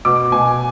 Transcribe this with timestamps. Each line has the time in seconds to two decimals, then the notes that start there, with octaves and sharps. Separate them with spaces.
0.05 B2 D6
0.32 B2 G#5